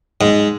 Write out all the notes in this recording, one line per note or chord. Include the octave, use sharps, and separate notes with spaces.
G#2